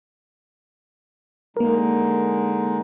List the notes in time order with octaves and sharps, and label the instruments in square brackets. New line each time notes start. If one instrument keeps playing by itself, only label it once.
[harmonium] D3 G#3 D#4 [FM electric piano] A#3 A#4